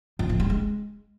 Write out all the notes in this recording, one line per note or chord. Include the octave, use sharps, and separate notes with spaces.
F3
A2
G3
G#3